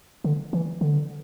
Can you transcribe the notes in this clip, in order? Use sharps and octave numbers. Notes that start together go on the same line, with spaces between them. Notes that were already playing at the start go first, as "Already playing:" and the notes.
D3
E3
D3